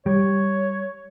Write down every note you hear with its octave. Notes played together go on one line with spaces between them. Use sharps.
G3 C#5